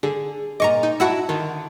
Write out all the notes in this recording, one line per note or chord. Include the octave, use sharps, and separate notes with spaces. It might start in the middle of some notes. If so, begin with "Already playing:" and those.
D3 G#4
A#2 C#3 D#5 A#5 C#6 D6
D#4
E4 F#4 E5 F#5 A5 E6
D3 D#3